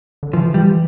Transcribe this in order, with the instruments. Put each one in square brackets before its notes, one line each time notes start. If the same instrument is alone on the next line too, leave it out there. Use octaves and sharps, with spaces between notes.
[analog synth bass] D3
[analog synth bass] E3 [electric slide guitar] F3
[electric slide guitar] G3